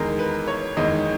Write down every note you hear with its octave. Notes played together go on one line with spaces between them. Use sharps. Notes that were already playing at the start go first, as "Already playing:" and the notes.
Already playing: E2 D#3 G#3 A#4
B4
C#5
E2 D#3 G#3 D#5